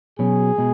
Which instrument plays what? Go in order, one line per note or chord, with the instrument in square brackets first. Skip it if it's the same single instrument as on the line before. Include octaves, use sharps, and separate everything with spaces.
[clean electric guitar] B2 F#3 C#4 [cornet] G#4
[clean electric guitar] B2 G#3